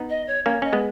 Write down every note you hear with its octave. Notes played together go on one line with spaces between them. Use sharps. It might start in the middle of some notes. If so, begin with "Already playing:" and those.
Already playing: B3 D#4
D#5
C#5
A#3 C#4 C#5
C#4 D#5
G#3 B3